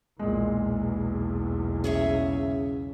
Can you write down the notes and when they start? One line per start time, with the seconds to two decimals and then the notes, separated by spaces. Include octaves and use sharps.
0.19 B1 E2 A#2 G#3
1.84 C#3 G#4 C#5 E5